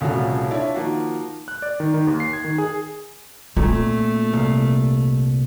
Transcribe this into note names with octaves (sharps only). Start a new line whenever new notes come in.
D#1 C2 C#3 F3 A3 F#4
D4 E4 F4 C#5 D5
D#3 F3 A#3 F#4 F5
F#6
D5
D#3
D#3
D#2
C7
G#6
D#3
G#4
A#2 A3 C4
C2 F5